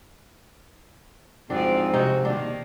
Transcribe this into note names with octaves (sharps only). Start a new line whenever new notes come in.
F2 G#2 F3 C4 D4 F#4 D5
C3 D#4 F#4
B2 D#3 A#3 D4